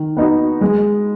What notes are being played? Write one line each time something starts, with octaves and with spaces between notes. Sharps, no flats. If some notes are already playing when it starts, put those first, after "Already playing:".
Already playing: D#3
B3 D#4 F#4
G#3